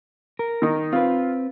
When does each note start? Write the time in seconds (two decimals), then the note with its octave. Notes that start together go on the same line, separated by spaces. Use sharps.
0.39 A#4
0.62 D#3 D#4
0.93 C4 F4 B4